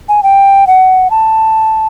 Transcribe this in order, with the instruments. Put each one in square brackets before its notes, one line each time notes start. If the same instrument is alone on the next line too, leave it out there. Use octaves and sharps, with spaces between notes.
[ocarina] G#5
G5
F#5
A5